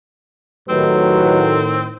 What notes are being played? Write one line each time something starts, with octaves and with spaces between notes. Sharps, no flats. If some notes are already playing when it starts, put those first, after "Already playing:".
A2 D#3 F#3 C4 D#4 G4 B4